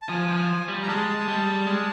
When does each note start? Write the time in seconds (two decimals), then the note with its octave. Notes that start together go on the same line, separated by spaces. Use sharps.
0.02 A5
0.09 F3 G#5
0.29 F3
0.68 G3
0.82 A#5
0.88 G#3 A5
1.28 G3
1.67 G#3